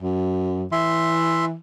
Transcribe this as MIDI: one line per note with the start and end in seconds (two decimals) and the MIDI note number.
0.01 0.66 42
0.72 1.56 52
0.72 1.45 76
0.72 1.45 84